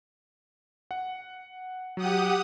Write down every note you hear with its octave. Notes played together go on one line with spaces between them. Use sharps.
F#5
F#3 G4 F#5 D#6